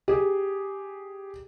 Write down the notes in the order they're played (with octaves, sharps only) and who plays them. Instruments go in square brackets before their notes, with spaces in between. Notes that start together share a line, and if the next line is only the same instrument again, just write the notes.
[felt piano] G4 G#4